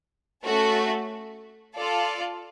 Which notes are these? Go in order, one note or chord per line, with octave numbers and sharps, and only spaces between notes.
A3 C#4 F#4 A4
F4 A4 D5